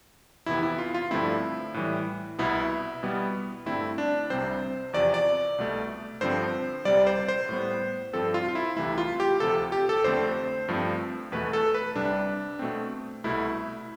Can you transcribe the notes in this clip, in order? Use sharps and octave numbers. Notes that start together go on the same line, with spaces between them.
F2 C3 E3 B3 E4
E4
F4
F4
G2 D3 F3 A3 C4 E4
A2 E3 G3
C2 B2 B3 E4
B2 G3 B3
G2 D3 A3 C4 E4
D4
C2 C3 G3 C4 C5
E2 C3 F3 D5
D5
C2 B2 A3
G2 D3 F3 C4 C5
C2 C3 G3 D5
C5
C5
A2 G3 B3
G2 F3 C4 A4
F4
F4
E4
C2 C3 E3 A3 E4
F4
G4
D2 C3 F3 A4
G4
A4
F2 D3 A3 C4 C5
G2 F3 A3 C4
E2 B2 A3 B4
A4
B4
C2 C3 G3 D4
B2 A3 C4
C2 B2 A3 E4